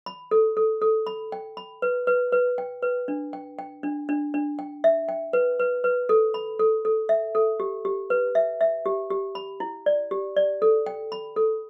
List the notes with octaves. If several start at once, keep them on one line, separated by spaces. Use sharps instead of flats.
B5
A4
A4
A4
B5
G5
B5
B4
B4
B4
G5
B4
D4
G5
G5
D4
D4
D4
G5
E5
G5
B4
B4
B4
A4
B5
A4
A4
E5
A4
G4
G4
B4
E5
E5
G4
G4
B5
E4
D5
G4
D5
A4
G5
B5
A4